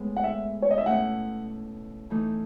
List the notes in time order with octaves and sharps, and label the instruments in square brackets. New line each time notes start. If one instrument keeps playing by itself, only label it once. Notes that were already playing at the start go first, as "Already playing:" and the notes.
Already playing: [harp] A2 G#3 B3
[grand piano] F#5
E5
C#5
D#5
E5
[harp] B2 A3 C#4 E4 [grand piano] F#5
[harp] E3 A3 D#4